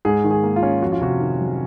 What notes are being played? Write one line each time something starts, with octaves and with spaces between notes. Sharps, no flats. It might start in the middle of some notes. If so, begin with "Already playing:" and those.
G#2 G#4
D#3
G#4
A#3
F4
C#4
F2 F#4
F4
C3 F#4
D#3
F#3